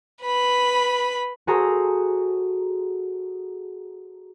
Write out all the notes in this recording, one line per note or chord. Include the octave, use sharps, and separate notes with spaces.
B4 B5
F#4 G#4 A4 C5 A#5